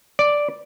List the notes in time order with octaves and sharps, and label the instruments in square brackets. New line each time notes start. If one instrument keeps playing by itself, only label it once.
[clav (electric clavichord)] D5